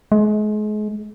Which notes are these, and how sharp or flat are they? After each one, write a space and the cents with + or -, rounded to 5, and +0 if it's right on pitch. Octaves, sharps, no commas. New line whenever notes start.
G#3 +35